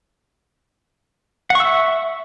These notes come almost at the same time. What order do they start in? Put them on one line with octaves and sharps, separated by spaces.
F#5 C#6 E6 E5